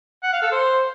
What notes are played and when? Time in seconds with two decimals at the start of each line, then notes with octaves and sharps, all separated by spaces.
0.23 F#5
0.33 F5
0.42 A4
0.52 C5